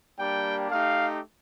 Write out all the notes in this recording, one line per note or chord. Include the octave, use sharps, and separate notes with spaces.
G3 A#3 D4 G4 G5
A3 D#4 G4 F5